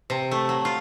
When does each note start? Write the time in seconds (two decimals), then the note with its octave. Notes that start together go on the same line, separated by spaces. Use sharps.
0.10 C3
0.31 A3
0.49 F#3
0.65 F4